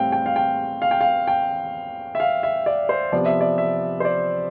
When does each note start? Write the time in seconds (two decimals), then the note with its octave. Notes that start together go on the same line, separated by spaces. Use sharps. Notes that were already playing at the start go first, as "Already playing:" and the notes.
Already playing: A2 G3 C4 F5 G5
0.12 G5
0.26 F5
0.36 G5
0.82 F5
0.91 G5
1.01 F5
1.27 G5
2.15 E5
2.20 F5
2.43 E5
2.66 D5
2.89 C5
3.12 C3 F3 B3 D5
3.26 E5
3.41 D5
3.58 E5
4.00 C5
4.05 D5